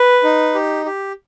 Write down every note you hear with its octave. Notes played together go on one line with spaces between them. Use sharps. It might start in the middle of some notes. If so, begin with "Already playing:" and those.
Already playing: B4
D#4
G4
G4